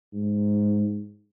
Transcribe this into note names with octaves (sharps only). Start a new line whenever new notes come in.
G#2